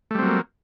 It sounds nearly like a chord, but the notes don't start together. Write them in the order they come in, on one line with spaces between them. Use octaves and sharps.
A3 G3 C4 F#3 A#3